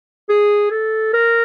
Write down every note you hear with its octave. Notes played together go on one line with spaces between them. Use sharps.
G#4
A4
A#4